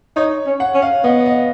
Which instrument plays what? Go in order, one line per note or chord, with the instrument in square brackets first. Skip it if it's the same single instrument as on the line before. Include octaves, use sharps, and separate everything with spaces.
[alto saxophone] D#4 [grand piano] C#5
[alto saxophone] C#4
[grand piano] F#5
[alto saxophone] C#4
[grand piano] F5
[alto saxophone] B3 [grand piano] D#5
[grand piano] D#5